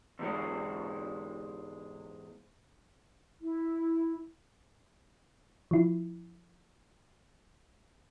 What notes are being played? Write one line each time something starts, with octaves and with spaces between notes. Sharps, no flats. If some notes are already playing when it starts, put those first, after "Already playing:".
E2 G#2 G#3
E4
F3 E4